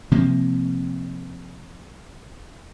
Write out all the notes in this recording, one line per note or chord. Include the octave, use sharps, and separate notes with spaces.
C3 F3 A#3